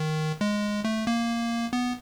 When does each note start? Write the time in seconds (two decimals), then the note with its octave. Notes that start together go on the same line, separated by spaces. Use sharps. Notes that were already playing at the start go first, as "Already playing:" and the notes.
Already playing: D#3
0.41 G#3
0.85 A3
1.07 A#3
1.73 B3